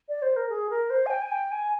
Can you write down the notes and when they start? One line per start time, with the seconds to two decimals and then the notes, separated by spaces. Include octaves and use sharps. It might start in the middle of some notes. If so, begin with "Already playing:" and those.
0.08 D5
0.22 C5
0.36 A#4
0.49 G#4
0.70 A#4
0.90 C5
1.06 G#5
1.10 G5
1.21 G#5
1.31 G5
1.51 G#5